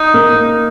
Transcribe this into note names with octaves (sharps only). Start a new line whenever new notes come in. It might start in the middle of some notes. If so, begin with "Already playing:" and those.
Already playing: D#4
A#3